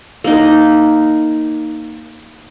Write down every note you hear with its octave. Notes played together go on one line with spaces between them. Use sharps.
A#3 D#4